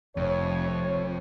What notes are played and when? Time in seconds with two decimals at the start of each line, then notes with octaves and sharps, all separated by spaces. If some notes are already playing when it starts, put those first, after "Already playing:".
0.17 F1 F2 C#5